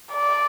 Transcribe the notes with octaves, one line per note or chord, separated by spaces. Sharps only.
D5